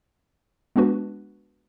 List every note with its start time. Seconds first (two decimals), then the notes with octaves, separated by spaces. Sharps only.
0.76 G#3 B3 D4 F#4 B4